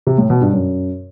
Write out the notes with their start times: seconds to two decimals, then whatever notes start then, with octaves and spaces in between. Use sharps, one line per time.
0.07 C3
0.18 A2
0.30 B2
0.41 G2
0.53 F#2